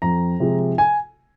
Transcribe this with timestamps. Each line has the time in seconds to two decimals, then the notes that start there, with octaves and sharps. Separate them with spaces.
0.02 F2 A#5
0.40 C3 F3 G#3
0.78 G#5